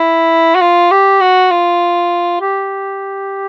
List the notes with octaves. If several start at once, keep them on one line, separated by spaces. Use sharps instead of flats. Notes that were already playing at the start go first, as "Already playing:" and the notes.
Already playing: E4
F#4
F4
G4
F#4
F4
G4